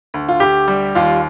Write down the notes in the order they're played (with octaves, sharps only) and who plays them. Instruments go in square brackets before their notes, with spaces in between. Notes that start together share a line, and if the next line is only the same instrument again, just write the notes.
[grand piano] D2
F4
D2 G4
G3
D#2 F4